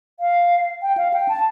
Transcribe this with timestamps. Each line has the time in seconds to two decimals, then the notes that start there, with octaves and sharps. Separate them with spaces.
0.20 F5
0.82 G5
0.97 F5
1.14 G5
1.29 A5